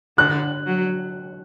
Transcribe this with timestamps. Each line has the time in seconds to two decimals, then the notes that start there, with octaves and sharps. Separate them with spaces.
0.18 D3 F#6
0.66 F#3